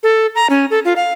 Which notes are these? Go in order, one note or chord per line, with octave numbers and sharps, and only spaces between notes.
A4
A#5
C#4
A4
F4
F5